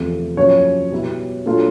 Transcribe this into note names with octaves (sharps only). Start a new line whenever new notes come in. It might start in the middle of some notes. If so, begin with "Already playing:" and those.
Already playing: E2 C3 F3 A3
F#2 C#3 F3 A#3 C#4 C#5
B2 G3 B3 E4
A#2 F#3 A3 D4 F4